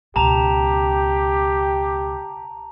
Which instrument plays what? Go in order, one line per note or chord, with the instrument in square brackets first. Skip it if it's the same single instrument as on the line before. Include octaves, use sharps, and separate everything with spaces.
[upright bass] C#2 B2 [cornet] G4 [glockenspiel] A5 A#5 F7